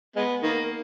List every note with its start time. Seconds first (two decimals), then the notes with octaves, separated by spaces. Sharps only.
0.16 G#3 B3
0.42 D#3 A#3